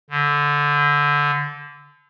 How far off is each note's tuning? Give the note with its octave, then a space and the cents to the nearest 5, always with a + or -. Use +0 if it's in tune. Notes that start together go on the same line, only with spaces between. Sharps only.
D3 -15